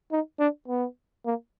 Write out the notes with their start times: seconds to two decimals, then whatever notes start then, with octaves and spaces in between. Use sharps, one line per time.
0.12 D#4
0.39 D4
0.68 B3
1.25 A#3